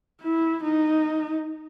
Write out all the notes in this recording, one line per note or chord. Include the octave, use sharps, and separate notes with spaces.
E4
D#4